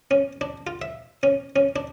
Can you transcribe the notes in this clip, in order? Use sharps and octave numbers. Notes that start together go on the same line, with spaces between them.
C#4
D4
F4
E5
C#4
C#4
D4